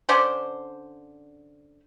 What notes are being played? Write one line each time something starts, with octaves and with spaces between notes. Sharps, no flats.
D3 C#4 D4 C5